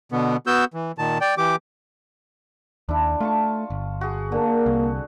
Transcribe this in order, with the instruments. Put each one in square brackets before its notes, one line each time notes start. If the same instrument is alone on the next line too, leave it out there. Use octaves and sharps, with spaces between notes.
[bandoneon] B2 D3 B3
B3 F#4 E6 G6
E3
A#2 D#3 A5
D5 G5
E3 G4 D6
[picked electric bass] D#2 [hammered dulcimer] D4 E4
[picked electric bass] A3 [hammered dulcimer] F4 A5 C#6
[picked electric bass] G1
[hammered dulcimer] F#4 G#4
[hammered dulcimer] D3 [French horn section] A#3
[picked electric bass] C2